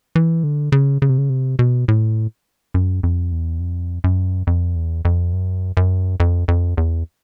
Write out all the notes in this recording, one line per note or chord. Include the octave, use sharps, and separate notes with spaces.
E3
D3
C#3
C#3
C3
C#3
C3
B2
A2
F#2
F2
E2
F2
F#2
F2
E2
F2
F#2
F#2
F2
F2
E2